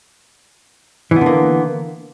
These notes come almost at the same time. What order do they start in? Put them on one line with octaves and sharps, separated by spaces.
E3 B3 D3 A#3